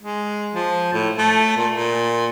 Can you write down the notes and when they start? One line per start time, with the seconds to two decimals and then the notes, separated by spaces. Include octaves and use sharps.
0.02 G#3
0.54 F3
0.93 A2
1.18 A3
1.57 A#2
1.73 A#2